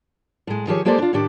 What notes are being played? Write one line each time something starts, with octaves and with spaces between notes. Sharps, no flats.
A2 G#3
D#3 F3 G4 G#4 C#5
G#3 A#3 G4 A4 C5 D5
D4 F4
A2 D#3 D4 G4